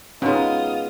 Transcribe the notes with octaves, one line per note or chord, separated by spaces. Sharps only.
B2 G#3 C#4 D#4 F4 A#4 D#6